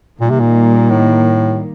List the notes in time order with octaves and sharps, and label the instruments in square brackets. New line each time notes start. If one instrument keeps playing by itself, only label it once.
[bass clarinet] A#2 [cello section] D#3 G3 A#3
[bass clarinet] C3
A#2
A2